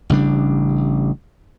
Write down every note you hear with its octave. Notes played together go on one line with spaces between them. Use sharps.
A1 C#3 G3 D4